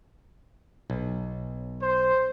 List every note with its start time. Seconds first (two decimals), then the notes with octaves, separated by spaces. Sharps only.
0.90 B1
1.80 C5